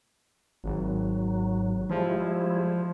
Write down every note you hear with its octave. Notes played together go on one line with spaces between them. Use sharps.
G#1 F#3
F3 G3 G#3 E4